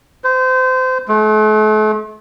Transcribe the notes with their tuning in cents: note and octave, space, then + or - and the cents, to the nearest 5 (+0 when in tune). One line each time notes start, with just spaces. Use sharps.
C5 -30
A3 -40